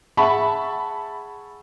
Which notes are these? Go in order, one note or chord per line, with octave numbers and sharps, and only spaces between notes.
G#4 E5 F#5 A5 B5 C#6